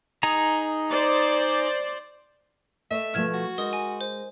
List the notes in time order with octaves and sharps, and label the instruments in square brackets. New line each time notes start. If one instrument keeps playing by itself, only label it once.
[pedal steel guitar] D#4 G#4 A#5
[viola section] C5 D5
[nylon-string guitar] A3 A4 D#5 [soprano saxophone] E5
[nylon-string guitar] B2 F3 A3 [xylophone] F6 G#6 E7
[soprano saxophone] F#4
[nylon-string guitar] G#3 D#4 [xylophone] A#4 D#5 D#6
[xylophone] G#5
C5